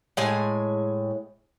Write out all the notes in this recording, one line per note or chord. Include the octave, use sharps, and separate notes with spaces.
A2 G#3 G#5